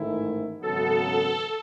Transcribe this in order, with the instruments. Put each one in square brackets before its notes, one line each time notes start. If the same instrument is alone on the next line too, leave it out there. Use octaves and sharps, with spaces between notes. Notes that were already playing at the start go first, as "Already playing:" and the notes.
Already playing: [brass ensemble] A1 G#2 D#3 A3 E4
[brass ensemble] G#1 F#2 C#3 F#3 B3 [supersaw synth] A4